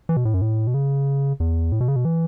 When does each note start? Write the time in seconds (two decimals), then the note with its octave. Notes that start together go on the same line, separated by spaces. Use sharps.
0.09 E3
0.17 B2
0.25 A2
0.34 F#2
0.41 A2
0.67 B2
0.74 C#3
1.40 E2
1.72 A2
1.80 B2
1.88 C#3
1.96 B2
2.05 E3